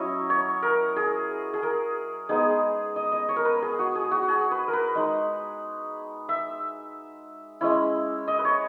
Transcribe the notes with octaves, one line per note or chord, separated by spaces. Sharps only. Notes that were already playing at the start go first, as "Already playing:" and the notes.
Already playing: F#3 C#4 E4 C#5 D#5
C#5
A#4
G#4
G#4
A#4
G#3 B3 D#4 G#4
D#5
D#5
C#5
A#4
B4
G#4
F#4
G#4
F#4
G#4
B4
A#4
B4
G#3 D#4
E5
G#3 C#4 E4
D#5
B4
C#5